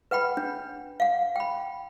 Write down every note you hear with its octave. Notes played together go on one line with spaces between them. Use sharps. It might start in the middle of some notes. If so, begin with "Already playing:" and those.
B4 F#5 G5 B5
D4
F5 F#5
G5 B5